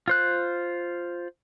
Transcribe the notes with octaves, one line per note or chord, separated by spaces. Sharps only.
F4 C5 F#6